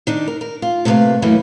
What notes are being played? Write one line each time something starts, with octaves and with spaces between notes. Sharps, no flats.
D#3 D4 D#4
A#4
A#4
F4
C3 A3 A#3 A4 B4 F5
F#2 E3 A3 A#3 C#4